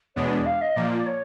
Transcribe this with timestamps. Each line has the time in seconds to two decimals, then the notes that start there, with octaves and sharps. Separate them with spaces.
0.16 E2 B2 G#3 B3 D4 C#5
0.31 D5
0.46 F5
0.61 D#5
0.76 A#2 F3 A#3 D5
0.98 D5
1.06 C#5